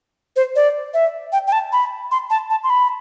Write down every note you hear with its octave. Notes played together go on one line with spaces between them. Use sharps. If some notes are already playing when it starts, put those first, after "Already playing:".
C5
D5
E5
G5
G5
A5
B5
C6
A5
A5
C6
B5